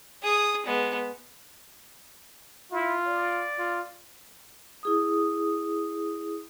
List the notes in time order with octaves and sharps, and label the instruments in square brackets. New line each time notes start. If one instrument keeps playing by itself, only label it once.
[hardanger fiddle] G#4 D#6
G#3 B3
[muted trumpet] E4 [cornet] F4
[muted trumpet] D5
[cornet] F4
[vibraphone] E4 G#4 D#6